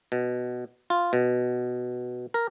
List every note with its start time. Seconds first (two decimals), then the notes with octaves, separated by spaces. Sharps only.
0.12 B2
0.90 F4
1.13 B2
2.34 A#4